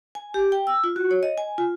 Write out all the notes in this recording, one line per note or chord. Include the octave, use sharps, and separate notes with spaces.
G#5
G4
G5
E6
F4
F#4
C#5
D#5
G#5
F4